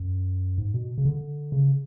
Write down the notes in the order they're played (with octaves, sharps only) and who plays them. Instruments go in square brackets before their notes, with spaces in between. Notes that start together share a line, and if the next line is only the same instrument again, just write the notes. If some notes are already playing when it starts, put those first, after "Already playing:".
Already playing: [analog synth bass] F#2
G#2
B2
C#3
D3
C#3